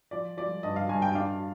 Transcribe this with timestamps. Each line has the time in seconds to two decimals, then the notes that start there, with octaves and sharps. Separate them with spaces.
0.11 F3 D5
0.37 F3 D5
0.63 G2 D#5
0.76 F5
0.89 G2 G#5
1.02 G5
1.15 D4 F5